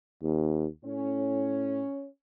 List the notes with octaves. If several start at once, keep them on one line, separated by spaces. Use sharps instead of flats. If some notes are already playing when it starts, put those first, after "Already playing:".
D#2
A2 C#4